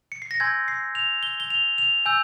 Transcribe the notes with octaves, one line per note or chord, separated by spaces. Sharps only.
C#7
C7
A#6
G#5 C6 E6 G6 G#6
C7
F7
G7
G7
F7
F7
G#5 E6 G6